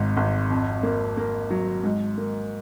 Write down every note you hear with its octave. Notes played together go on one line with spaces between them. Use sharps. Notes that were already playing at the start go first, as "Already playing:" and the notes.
Already playing: G#1 G#2
G#1
F2
A#3
A#3
F#3
G#2
A#3